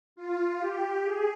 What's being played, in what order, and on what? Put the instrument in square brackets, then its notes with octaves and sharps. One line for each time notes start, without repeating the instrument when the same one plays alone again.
[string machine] F4
G4
G#4